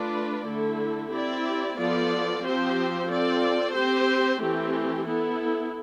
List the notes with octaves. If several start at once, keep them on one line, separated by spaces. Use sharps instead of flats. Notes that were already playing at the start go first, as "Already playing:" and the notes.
Already playing: A3 D4 F4 B4 D5
D3 A3 E4 A4
C4 E4 G4 D5
F3 B3 F4 A4 D5
F3 C4 G4 C5
C4 F4 A4 D5
C4 G4 C5
E3 A3 C4 G4
B3 E4 A4